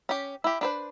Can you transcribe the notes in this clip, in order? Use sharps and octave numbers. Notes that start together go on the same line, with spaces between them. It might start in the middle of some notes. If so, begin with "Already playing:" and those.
C#4 G4
E4 G4
D4 B4 C5